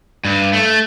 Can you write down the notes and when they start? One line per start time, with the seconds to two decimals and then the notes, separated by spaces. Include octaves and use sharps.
0.25 G2
0.53 A3